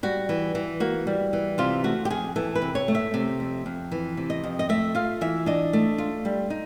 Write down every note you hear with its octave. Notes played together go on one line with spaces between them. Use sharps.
G3 F#4
E3
E3
A#3 F#4
G3
E3
C3 F4
A3 F#4
G4
F2 G#4
E3 A4
B4
C3
C#5
A3
E5
C3
F2
F2
E3
C3
D#5
F2
D#5
A3 E5
F4 F5
E3 E5
D4 D#5
A3
F4
G3
D#4